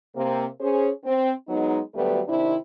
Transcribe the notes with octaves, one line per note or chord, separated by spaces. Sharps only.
C3 A#3 C4
C#4 G#4 C5
C4
F#3 G#3 B3 D#4
D2 F#3 G3 A3 B3 B4
C3 D#3 C4 D4 E4